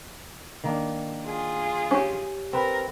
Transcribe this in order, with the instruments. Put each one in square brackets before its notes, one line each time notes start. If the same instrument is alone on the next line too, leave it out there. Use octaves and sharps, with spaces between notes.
[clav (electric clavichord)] D#3 A#3 D4
[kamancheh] F4 G#4
[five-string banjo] C#4 G4
[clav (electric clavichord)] C4 B4 [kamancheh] A#4